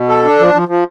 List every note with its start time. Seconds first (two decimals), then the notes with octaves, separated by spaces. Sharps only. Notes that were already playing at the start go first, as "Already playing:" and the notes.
Already playing: B2
0.09 A4
0.24 D4
0.39 F3
0.54 F3
0.68 F3